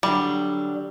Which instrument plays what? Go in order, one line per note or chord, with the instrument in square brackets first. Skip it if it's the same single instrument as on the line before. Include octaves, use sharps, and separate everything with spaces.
[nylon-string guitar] D3 F#3 [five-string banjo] G3